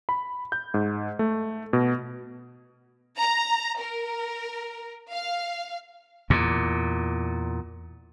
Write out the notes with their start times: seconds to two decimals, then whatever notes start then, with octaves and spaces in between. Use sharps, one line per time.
0.09 B5
0.52 G6
0.74 G#2
1.19 A3
1.73 B2
3.19 A#5
3.81 A#4
5.12 F5
6.30 E2 A#2